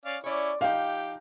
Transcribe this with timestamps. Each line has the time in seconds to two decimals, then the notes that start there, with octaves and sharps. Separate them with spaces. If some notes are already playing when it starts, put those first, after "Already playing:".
0.06 C#4 D5 F5
0.24 C#4 E4 C#5 D5
0.61 F3 D#4 G4 F5 G5